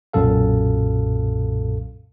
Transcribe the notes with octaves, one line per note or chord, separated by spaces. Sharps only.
B1 F#2 A#2 A4 F5